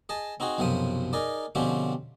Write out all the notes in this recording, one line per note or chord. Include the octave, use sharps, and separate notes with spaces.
G#4 D#5 A5
C4 D#4 F#4 G#4
B1 F#2 C3 F3 C5 D#6
D#4 G#4 A#4 D5
B2 D3 F3 C4 C#4 G4